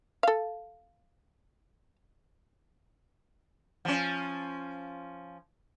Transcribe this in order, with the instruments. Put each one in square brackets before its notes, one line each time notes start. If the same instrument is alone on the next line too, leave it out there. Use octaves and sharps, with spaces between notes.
[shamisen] A4 F5
[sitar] F3 C#4